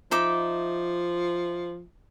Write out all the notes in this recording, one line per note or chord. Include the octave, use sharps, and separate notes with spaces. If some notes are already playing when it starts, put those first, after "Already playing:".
F3 D#4 E5 D6